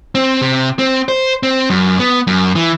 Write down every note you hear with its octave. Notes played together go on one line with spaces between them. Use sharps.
C4
C3
C4
C5
C4
F#2
B3
F#2
E3